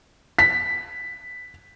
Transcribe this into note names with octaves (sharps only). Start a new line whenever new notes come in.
B6